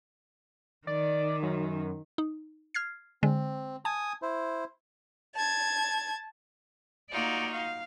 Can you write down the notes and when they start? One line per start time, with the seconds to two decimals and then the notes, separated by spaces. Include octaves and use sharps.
0.87 D#3 D5
1.43 F#2
2.18 D#4
2.74 F6 G#6 C7
3.23 D3 G#3 C4
3.85 G#5 A5 D#6
4.22 E4 C5
5.35 A5 G#6
7.10 A#3 D#4 F4 F#4 D5
7.53 F5